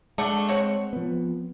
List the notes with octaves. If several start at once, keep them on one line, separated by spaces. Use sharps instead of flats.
G#3 A3 D4 F#5
C4 C#5 F#5
F3 B3